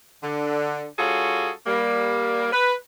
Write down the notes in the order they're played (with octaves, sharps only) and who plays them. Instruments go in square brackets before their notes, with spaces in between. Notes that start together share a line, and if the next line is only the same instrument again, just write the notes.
[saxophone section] D3
G3 C#4 F4 F#4 G#4 A4
G3 A#3
B4